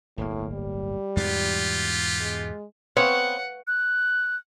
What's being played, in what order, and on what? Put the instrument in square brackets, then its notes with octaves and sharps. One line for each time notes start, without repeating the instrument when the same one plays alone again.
[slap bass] D1 G1 A#3 [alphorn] A2
[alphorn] G3
[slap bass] E2 G#2 B2 [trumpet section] B3 F4 G4
[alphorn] G#3
[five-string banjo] B3 C4 [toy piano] B4 F5 [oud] C#5 [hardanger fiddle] F#5
[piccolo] F#6